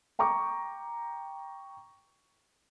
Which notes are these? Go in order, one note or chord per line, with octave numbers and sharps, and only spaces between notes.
G5 A#5 C#6 D6